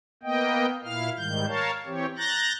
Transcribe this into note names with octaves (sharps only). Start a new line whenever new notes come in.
A#3 B3 D#5 G5
A#2 E4 F5 F6
G#2 D#3 G3 G6
A#4 C#5 F5 A5
E3 C4 G4 C#5
A#5 F#6 G6 A6 A#6